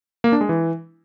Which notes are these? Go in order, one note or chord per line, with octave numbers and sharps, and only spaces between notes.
A#3
D4
G#3
E3